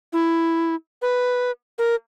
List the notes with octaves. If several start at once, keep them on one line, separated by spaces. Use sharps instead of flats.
E4
B4
A#4